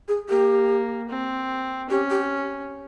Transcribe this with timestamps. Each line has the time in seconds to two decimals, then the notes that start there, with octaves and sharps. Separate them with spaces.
0.08 G#4
0.29 A#3 G4
1.09 C4
1.89 C#4 G4
2.10 G4